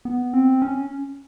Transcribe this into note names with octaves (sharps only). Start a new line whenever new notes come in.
B3
C4
C#4